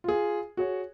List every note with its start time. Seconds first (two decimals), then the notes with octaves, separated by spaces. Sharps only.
0.04 F4 G#4
0.57 F#4 G#4 C#5